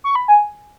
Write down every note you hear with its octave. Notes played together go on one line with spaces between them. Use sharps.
C#6
B5
G#5